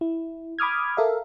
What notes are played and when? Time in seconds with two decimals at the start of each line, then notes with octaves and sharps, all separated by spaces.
0.01 E4
0.59 B5 D6 D#6 F6 G#6
0.97 A4 A#4 E5 F5